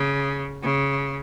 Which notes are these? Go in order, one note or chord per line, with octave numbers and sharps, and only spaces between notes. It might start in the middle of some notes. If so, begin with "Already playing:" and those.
Already playing: C#3
C#3